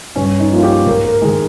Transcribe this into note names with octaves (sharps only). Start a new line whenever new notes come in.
G2 C#4
D#4
F3 A#3 F4
G4
G#2 A#4
A#4
D#3 G#3 G#4